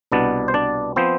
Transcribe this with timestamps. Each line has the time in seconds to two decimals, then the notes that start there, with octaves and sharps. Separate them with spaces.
0.12 C2 B2 B3 D4 D5
0.48 C5
0.54 D4 D5
0.96 F3 B3 C4 C5